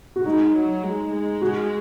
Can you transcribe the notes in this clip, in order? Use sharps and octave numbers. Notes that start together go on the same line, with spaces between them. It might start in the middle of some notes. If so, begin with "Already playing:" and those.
F#4
G#3 D#4
F#3
G#3
G#3
F#4